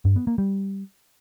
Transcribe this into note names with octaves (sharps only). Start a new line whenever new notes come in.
G2
B3
A#3
G3